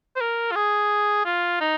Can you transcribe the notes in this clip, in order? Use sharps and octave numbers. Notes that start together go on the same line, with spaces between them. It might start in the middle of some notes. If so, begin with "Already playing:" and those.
C5
A#4
F4
G#4
F4
D#4